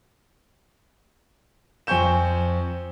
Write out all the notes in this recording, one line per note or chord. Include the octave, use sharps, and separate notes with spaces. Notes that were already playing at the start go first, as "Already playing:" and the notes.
F2 C4 G#5 C#6 G6 E7